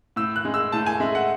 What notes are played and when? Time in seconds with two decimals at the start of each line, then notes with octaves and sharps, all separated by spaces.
0.16 A2 E6
0.36 F#6
0.45 G#3
0.54 E6
0.72 A2 A5
0.86 G#5
1.00 G#3 E5
1.15 F#5